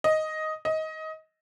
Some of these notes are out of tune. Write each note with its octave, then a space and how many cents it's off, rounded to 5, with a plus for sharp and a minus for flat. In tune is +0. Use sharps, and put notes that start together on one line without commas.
D#5 +5
D#5 +20